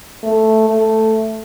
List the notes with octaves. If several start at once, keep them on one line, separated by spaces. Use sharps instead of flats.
A3
A3